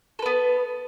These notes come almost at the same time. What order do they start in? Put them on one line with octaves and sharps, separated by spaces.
A4 B4 B3